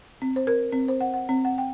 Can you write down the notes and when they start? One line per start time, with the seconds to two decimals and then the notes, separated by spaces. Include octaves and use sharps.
0.22 C4
0.36 C5
0.47 A#4
0.73 C4
0.88 C5
1.01 F#5
1.14 F#5
1.29 C4
1.45 F#5
1.58 G5